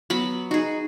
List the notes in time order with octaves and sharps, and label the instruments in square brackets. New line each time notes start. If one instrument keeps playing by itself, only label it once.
[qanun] F#3 B3 B5
[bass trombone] D#4 [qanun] F#4 G#4